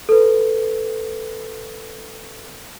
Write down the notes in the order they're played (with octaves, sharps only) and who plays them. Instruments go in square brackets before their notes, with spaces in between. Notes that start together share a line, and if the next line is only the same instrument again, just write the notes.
[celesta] A4 B4